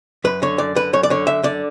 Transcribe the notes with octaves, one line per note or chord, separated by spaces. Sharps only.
F#2 B4
D3 C#5
F#2 D5
D3 B4
F#2 C#5
D5
D3 C#5
F#2 E5
D3 D5